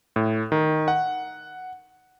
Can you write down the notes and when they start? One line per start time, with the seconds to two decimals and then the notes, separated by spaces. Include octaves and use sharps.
0.16 A2
0.52 D#3
0.88 F#5